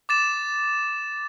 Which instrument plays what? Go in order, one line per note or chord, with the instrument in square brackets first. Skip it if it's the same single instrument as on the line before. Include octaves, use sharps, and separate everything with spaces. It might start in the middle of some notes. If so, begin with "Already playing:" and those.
[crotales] D6 A6 E7